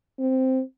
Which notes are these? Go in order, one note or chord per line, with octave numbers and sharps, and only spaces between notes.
C4